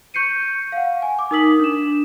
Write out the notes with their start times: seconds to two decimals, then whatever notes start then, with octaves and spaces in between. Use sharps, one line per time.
0.14 C#6 G6 C7 C#7 D#7
0.72 F5 F#5
1.02 G#5
1.19 D6
1.31 D#4 A#4 D#6 E6 B6 F#7
1.60 D4 E7